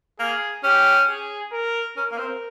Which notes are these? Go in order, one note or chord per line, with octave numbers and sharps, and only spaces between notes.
A#3 G#4
C#4 G4
G#4
A#4
C#4 A#4
A#3
C4